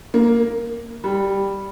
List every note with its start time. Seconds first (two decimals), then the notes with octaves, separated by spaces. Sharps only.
0.14 A#3
1.04 G3